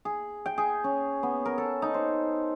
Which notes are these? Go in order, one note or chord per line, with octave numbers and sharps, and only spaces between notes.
G#4
G5
G#4
C#4
B3
A#4
A4
D#4
C5